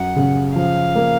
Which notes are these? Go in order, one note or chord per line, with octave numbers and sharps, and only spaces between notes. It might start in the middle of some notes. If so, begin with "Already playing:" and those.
Already playing: F#2 F#5
C#3
F3 F5
A#3